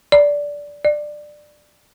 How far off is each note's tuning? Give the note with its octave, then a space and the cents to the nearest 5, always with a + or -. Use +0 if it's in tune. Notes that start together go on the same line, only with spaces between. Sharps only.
D5 -15
D5 +15